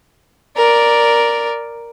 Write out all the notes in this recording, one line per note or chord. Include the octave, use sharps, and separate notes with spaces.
A#4 D5